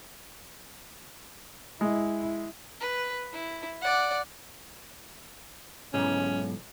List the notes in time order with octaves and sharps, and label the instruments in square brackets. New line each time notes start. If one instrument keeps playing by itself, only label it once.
[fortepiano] G#3 [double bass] E4
[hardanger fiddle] B4
E4
D5 F#5
[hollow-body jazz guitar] B1 G#2 [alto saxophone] C#4